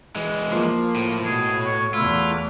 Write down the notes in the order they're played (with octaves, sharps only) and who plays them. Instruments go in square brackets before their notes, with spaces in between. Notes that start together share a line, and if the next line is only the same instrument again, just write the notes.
[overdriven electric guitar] E3 G#3
[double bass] F3 A#3
[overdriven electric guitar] A2
[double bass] B2 [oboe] G#4
[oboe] C#5
[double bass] E2 A3 [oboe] E4 [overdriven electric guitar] F4